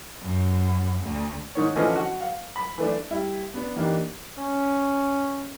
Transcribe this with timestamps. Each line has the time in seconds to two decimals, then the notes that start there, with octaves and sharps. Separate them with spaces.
0.22 F#2
1.03 D2
1.55 G#2 D#3 C#5
1.76 D3 E3 F3 C#4 D#5
1.96 F#4
2.21 F5
2.56 B5
2.78 E3 A3 D4
3.10 G3 E4
3.54 B3 D4
3.76 E3 A#3 D4 D#4 G4
4.38 C#4